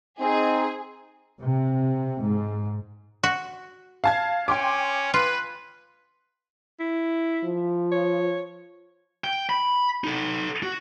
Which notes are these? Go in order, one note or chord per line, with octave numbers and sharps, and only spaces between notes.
C4 D#4 G#4
C3
G#2
F#4
F5 A5 G#6
C#4 G5 C6 D6
F4 B4
E4
F3
C#5
G5
B5
D#4 A4
F#4